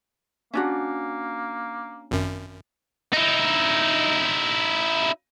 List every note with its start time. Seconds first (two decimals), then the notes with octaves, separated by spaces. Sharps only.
0.53 A#3 C#4 D4 F#4
2.11 G#1 F#2
3.13 D#4 E4